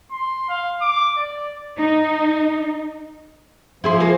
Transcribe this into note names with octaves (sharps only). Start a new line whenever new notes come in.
C6
F5
D6
D5
D#4
F3 E4 G#4 C5
A#3 G#4